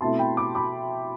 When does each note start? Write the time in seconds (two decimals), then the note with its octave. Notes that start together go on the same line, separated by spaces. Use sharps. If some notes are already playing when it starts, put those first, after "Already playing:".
0.01 B2 A3 C4 E4 A5 C6
0.19 G5 B5
0.37 B5 D6
0.55 B5 D6